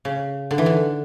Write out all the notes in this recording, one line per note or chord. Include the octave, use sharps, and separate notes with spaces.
C#3
D3
E3
D3